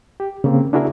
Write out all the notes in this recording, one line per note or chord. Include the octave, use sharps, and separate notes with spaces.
G4
C#3 A#3 C4
D4 E4 F#4 G#4 A#4 E5